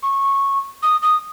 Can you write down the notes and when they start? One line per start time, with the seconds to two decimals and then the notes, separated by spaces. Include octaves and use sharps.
0.02 C#6
0.82 D#6
1.02 D#6